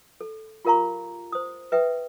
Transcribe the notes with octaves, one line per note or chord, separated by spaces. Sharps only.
A4
F4 G4 A#4 F5 A#5 C#6
C5 D#6
B4 E5 G5 D#6